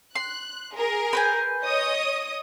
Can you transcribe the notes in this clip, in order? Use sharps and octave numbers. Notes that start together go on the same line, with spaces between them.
C6 F#6
G#4 A#4
B4 C5 G#5
C#5 D#5 D#6